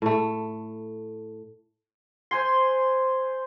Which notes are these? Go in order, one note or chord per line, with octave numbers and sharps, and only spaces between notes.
A2 A3
C5 G#5 C6